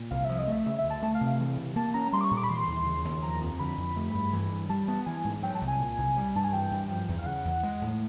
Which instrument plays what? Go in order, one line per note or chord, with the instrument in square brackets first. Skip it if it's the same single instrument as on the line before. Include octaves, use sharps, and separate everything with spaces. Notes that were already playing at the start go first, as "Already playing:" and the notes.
Already playing: [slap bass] A#2
[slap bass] C2 [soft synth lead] F5
[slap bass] F3 [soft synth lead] E5
[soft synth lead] D#5
[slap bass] A3 [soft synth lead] E5
[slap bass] C#3 [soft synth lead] E5
[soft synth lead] E5
[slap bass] D2
[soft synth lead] A5
[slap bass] A3 [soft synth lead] A5
[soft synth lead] F5
[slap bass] C3
[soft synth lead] F5
[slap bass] E3
C3
[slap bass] A#3 [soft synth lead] A5
[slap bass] C#4 [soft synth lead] A#5
[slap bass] G3 [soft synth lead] C6
[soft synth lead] D6
C#6
[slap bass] A#2
[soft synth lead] D6
B5
[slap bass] E3 [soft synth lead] C6
[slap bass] D#2
C#3
D#2
[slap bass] F3 [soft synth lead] A#5
[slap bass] F2
[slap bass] D3 [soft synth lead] B5
[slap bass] F2
A3
G2
E3
G2
[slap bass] G3 [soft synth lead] A5
[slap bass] B3 [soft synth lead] A5
[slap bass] E3 [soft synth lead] G#5
[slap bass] G#2
[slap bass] F#3 [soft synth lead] G5
[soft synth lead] A5
[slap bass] C2
[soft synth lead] G#5
[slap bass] A#2
C2
G3
[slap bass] G2 [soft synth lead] A5
[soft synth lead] G#5
[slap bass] E3 [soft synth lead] G5
[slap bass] G2
F3
E2
[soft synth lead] F5
[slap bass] C#3 [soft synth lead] F#5
[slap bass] E2
G#3
A2